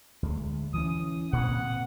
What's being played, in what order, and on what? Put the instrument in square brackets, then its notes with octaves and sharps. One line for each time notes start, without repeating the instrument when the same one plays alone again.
[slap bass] D2 G#3
[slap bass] E3 C#4 [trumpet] D#6
[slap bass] A#2 A#3 C4 [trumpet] F#5